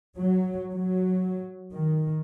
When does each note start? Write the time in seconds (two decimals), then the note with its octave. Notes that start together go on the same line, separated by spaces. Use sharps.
0.18 F#3
0.73 F#3
1.72 D#3